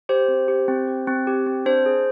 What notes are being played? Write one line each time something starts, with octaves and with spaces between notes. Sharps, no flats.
G4 C5
C4
G4
C4
G4
C4
G4
C4
D4 C5
G#4